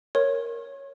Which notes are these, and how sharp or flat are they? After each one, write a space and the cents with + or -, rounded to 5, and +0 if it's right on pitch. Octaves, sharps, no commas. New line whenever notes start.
A#4 +0 C#5 +0 C#6 -40